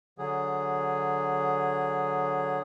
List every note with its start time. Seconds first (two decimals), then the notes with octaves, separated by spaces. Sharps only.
0.18 D3 F#3 G#4